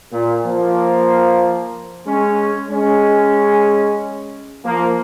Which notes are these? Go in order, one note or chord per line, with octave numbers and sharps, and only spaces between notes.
A#2
F3 A#3
G#3 C#4
G#3 C#4
F3 A#3